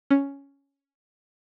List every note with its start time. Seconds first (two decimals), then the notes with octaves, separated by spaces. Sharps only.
0.11 C#4